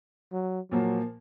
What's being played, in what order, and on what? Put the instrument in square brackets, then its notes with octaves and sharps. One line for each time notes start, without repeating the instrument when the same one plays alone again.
[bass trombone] F#3
[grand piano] A#2 F3 A#3 [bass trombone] F#3